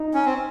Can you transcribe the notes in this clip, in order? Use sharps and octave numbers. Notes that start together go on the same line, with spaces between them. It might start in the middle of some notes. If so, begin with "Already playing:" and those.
Already playing: D#4
C#4
C4